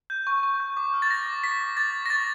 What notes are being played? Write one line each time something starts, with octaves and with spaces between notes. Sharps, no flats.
G6
C#6
C#6
G6
D6
F6
A6
D6 A#6
D6
D6 B6
D6
D6 A6
D6
A#6
C#6 A6